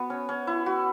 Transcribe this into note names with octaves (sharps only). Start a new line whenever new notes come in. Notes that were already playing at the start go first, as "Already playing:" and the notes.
Already playing: B3 F#4
C#4
C#4
E4
F#4